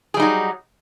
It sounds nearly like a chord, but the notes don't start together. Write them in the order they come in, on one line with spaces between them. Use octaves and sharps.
G#4 G3 D#4 F#3